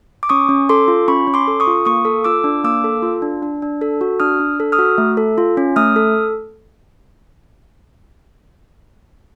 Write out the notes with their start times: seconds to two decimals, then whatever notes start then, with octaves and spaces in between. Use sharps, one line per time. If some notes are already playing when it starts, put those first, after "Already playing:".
0.23 D6
0.29 C#4 C#6 D#6
0.49 C#4
0.69 A4 C6 D6
0.88 F4
1.08 C#4 B5 C#6
1.27 C#4
1.34 C6 D6
1.48 A4
1.60 C#6 D#6
1.67 F4
1.85 A#3 C#6 D#6
2.05 A4
2.24 F4 D6 E6
2.44 D4
2.64 A#3 D6 E6
2.84 A4
3.03 F4
3.22 D4
3.42 D4
3.62 D4
3.81 A4
4.01 F#4
4.20 D4 D#6 F6
4.40 D4
4.60 A4
4.72 D#6 F6
4.79 F#4
4.98 A3
5.17 A4
5.38 F4
5.57 C#4
5.76 A3 D#6 F6
5.96 A4